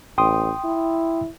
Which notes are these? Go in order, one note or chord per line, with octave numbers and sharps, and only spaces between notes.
A1 G5 C6 D#6
E4